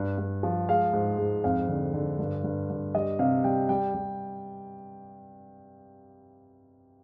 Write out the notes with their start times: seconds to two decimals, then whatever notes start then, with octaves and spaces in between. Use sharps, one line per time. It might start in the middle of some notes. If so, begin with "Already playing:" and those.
Already playing: G2
0.18 G2
0.43 F3
0.69 G#3 F5
0.93 G#2
1.19 G#2
1.44 F2 F5
1.69 D3
1.94 D3
2.19 G2
2.44 G2
2.70 G2
2.95 G3 D#5
3.19 C3 F5
3.44 G3 G5
3.69 G3 G5
3.94 G3